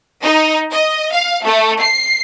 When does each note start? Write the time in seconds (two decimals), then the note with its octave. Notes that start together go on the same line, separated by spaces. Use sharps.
0.22 D#4
0.71 D#5
1.11 F5
1.43 A3
1.80 C7